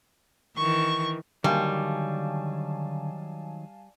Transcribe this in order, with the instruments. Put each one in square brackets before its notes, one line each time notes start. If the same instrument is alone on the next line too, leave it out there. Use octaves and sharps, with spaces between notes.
[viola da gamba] D#3 E3 [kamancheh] C#6
[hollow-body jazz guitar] D3 A#3 [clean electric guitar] D#3 F#3 [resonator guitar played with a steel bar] G3 [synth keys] F5 G#5 A5